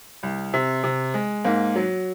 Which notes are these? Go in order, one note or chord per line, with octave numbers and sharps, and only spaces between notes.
C2
C3
C3
G#3
G#2 A#3
F#3